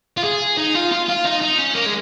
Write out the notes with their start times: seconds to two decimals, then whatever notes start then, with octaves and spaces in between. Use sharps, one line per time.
0.17 F4
0.24 G#4
0.57 D#4
0.75 F4
0.92 F4
1.08 F4
1.25 D#4
1.41 D#4
1.58 C#4
1.74 A#3
1.86 G#3